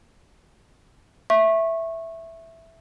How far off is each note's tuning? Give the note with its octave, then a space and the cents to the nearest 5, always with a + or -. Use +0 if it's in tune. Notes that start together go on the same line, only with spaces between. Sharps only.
E5 +0 C#6 -25